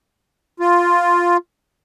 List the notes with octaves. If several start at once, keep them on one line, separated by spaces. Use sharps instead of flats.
F4